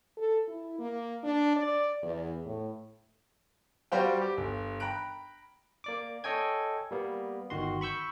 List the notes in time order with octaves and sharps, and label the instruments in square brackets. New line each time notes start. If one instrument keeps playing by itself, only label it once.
[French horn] A4
E4
A#3
D4
D5
E2
A2
[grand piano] G3 F#4 B4 C5 F5 G5
G4
G1
G5 A#5 B5 F#6 D7
[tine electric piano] A#3 D5 D6
A4 C#5 D#5 G5 G#5 G#6
G3 A#3 B3
G1 D#3 F#4 C6
B5 C#6 E6 G6